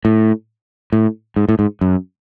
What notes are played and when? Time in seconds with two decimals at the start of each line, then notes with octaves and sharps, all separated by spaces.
0.05 A2
0.93 A2
1.36 G#2
1.49 A2
1.59 G#2
1.81 F#2